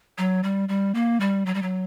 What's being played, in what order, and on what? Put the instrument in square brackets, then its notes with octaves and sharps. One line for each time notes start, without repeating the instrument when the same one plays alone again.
[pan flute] F#3
G3
G3
A#3
G3
F#3
G3
F#3